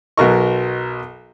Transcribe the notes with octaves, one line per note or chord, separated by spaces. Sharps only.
B1 B2 F#4 A#4 D#5 C#6